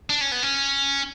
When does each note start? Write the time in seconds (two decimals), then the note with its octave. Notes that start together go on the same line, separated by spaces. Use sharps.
0.10 D4
0.21 C#4
0.32 B3
0.43 C#4